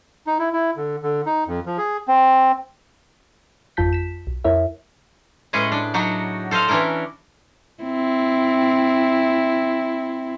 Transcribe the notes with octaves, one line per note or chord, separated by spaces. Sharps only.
D#4
E4
E4
D3
D3
D#4
F2
F3
G#4
C4
G#1 F2 F4 A5 G6 B6
B6 E7
B1
F2 E4 A#4 C#5 E5
A2 G#3 C#4 G#4 B4 D#5
D4
F#3 D4 D#4 F#4
A4 C5 D#5 F5
E3 C#4 D4 E4 A#4
C4 E4